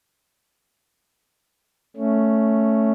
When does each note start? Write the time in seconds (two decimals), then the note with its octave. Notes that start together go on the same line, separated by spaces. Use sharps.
1.96 A3 C#4